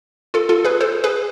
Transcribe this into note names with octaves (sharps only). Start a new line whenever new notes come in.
F4 A4
F4 A4
G#4 B4
A4 C5
G#4 B4